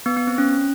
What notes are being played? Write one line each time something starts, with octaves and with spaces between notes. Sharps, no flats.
B3
B3
C4
C#4